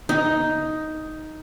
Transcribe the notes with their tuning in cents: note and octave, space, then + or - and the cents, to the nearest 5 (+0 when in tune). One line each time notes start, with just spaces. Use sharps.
D#4 +5